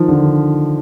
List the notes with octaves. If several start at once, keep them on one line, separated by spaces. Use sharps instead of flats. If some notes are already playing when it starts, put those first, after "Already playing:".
Already playing: D#3 F3
D3